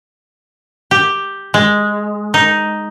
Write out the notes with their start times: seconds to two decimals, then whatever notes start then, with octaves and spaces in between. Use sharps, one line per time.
0.91 G4
1.54 G#3
2.34 D#4